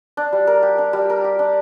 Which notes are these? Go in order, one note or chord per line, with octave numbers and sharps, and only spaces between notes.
D4
G3
A#4
G4
D4
G3
A#4
G4
D4